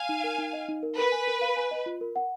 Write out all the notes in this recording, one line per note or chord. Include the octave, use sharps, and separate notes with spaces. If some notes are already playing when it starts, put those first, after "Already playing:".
Already playing: F5 G#5
D#4
A#4
D#4
D#5
D#4
A#4
A#4 B4
G#5
A#4
F5
G#5
D#5
F4
A#4
F#5